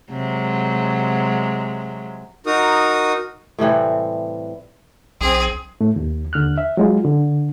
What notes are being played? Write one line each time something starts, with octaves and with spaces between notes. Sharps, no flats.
C3 F#3 G#3
D#4 F#4 A#4 D#6
A2 C3 E3 G3
B1 C4 G#4
A2 A3
D#2
D#2 D3 F6 F#6
E5
F#3 G#3 F4
D3